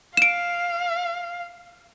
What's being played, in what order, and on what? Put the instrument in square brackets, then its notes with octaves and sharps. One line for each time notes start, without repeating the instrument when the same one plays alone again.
[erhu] F5 [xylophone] D7 E7